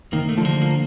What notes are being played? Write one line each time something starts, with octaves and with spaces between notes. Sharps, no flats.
C3 D#3 A#3
A3
D3 F3
A#3
A#3